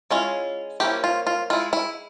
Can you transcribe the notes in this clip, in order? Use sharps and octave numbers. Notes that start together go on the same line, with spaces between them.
G#3 C#4 E4 F4
F3 A#3 C#4 E4 G4
F4
F4
G#3 E4 F4
E4